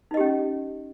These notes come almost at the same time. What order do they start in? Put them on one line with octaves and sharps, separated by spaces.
D#4 D#5 G4 C#4